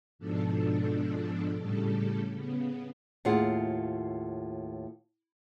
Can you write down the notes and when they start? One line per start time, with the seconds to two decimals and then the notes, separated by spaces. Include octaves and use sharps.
0.19 G#2 B2 F3 D4 A4
1.57 A2 C#3 G3 A4
2.35 C#3 B3
3.25 D#2 A2 F4 G#4 F#5